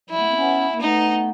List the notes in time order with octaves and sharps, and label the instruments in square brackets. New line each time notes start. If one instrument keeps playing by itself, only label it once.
[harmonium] F3 G3 [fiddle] E4
[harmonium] A3 B3
A#3 C4
B3 C#4
A#3
[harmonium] A3 B3 [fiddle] D#4